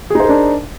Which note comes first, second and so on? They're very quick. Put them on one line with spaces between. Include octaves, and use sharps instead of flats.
G#4 D#4 C5 A#4 D4